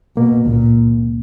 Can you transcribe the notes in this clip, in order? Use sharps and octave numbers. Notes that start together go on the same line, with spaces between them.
B2 A#3
C#2 A#2